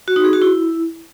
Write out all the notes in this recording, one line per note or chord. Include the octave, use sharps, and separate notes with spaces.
F#4
D#4
G#4
F#4
E4